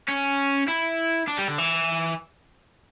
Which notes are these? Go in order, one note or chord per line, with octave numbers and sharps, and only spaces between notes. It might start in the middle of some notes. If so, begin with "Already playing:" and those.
C#4
E4
D4
G3
D3
E3